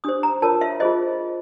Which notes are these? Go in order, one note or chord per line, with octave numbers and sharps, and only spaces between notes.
D4 G4 C5 D#6
A#5
F4 A#4 C#5 A5
E5
F4 G#4 C5 D#5